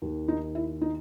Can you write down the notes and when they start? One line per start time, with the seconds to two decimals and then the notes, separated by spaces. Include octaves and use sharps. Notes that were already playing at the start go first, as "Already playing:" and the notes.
0.02 D#2 D#3
0.28 D#4
0.55 E4
0.82 D#4